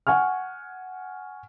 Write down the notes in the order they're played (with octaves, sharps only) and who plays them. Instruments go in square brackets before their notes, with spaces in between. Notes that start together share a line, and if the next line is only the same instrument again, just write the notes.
[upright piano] F#5 G#5 C#6 F6